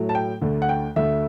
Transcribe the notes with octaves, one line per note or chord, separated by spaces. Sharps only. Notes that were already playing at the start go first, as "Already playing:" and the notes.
Already playing: A2 F#3 A3
A5
G5
D2 D3 A3
F#5
G5
D2 D3 A3 E5